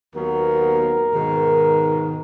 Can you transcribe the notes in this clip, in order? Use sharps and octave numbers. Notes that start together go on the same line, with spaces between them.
D#2 F#3 B3 A#4
G#2 B2 D#3